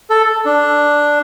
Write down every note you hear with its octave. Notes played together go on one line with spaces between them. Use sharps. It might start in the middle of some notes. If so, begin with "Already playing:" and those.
A4
D4